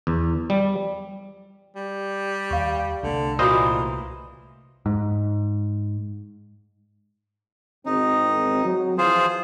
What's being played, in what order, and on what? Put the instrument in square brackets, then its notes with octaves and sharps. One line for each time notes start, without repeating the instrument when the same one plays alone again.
[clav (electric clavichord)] E2
G3
[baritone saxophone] G3
[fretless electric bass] D#2 [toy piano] F5 C#6
[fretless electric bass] C2 A3 [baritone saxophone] D3
[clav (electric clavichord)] A#2 C5 D#5 [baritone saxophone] E3 [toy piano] F#4 B5 D#6
[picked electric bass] G#2
[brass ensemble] G#1 E2 C4 [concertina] D#4
[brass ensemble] F#3
[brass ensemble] E3 F3 [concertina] F4 G#4 C5